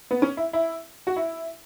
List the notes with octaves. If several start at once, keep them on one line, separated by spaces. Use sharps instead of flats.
B3
C#4
E4
E4
F#4
E4